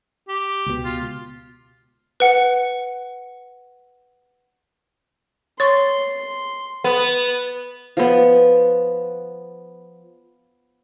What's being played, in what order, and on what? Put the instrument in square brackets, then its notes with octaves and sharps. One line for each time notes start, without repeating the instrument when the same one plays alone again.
[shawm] G4
[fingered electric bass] C#2 B2
[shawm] F4
[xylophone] B4 F#5 C#7
[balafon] C#5 C#6 [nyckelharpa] C6
[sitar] B3
[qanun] F3 B3